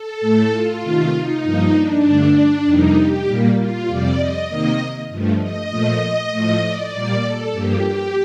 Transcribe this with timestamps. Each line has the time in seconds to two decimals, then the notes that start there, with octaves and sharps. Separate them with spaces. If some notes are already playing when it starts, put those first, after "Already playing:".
Already playing: A4
0.21 A2 A3
0.52 F4
0.82 C3 D#3 A3
1.13 D#4
1.43 G2 F3 A#3
1.73 D4
2.04 G2 D3 A3
2.65 F2 C3 G3 A#3 D#4
2.96 G4
3.26 A#2 G3 A#3
3.56 F4
3.87 F2 C3 G3 D5
4.17 D#5
4.48 C3 D#3 A#3 D#5
5.09 G2 F3 A3
5.40 D#5
5.70 A#2 F3 A3
6.31 A2 F3 A3
6.62 D5
6.92 A#2 G3 A#3
7.22 A4
7.53 G2 F3 A#3 G4
7.84 G4